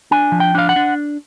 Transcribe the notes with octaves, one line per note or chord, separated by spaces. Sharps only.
D4 G#5
F3
G5
D4 F5
F#5
D4